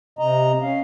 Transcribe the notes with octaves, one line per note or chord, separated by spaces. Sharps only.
C3 D#5 A#5
C#4 F5